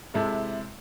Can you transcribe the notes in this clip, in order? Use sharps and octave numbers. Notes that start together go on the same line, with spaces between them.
C3 G#3 E4 A4